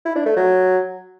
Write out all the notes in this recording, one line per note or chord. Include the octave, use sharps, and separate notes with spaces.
E4
D4
A3
F#3